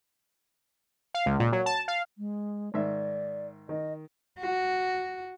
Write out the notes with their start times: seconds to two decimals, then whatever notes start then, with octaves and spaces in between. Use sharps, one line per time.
1.14 F5
1.26 C#2
1.40 A#2
1.52 F#3
1.66 A5
1.88 F5
2.18 G#3
2.74 G#2 D#3 D5 E5
3.69 D#3 D#5
4.39 F#4